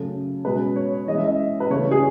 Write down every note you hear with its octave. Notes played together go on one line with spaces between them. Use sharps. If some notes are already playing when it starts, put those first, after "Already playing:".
Already playing: C#3 F#3 A3
B2 G#3 C#4 B4
C#5
E3 G#3 C#4 D#5
E5
D#5
B4
C#3 E3 A3 C#5
G#4